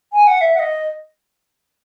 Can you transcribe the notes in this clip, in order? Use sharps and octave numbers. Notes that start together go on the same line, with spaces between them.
G#5
F#5
E5
F#5
D#5